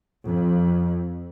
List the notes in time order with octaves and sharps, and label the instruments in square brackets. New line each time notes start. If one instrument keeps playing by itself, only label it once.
[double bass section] F2